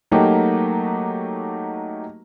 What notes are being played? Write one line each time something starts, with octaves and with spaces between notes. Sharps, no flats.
F#3 A3 A#3 D#4 F#4 G4